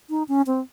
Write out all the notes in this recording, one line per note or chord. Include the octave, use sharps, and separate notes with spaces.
D#4
C#4
C4